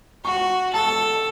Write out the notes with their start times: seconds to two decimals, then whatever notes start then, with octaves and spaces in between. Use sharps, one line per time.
0.24 F#4 C#6
0.73 A4 A5